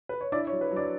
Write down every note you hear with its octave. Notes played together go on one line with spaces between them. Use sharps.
B4
C#5
D4 E4 D5
C#5
F#3
B4
F#3
D4 D5